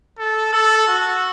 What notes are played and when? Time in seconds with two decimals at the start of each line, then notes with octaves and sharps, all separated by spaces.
0.18 A4
0.53 A4 E6
0.65 E6
0.76 E6
0.88 F#4